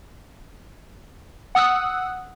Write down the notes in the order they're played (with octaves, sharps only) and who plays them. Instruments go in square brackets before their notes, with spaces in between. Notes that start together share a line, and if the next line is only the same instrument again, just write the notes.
[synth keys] F#5 D#6 E6 F#6